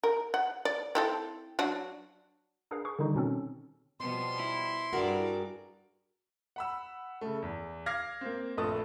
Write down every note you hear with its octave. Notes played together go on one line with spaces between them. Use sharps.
A#4
F#5
D5
C4 E4 A4
F#3 D4 F#4
D4 G#4 A#4 B4 F5
G#4 B4 C#6
D3 D#3 G3 D#4
B2 C4 C#4 A4
B2 F3 G3 B3 C6
E4
G2 F#4 G#4 A#4 D5
F#5 B5 E6
C#3 A3
E2
F5 D6 F6 G#6 A#6
A#3 C4
A#1 A3 A4 B4 A5 D#6